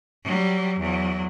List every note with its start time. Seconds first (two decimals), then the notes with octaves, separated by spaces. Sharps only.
0.23 F#3 G3
0.79 E2 F#3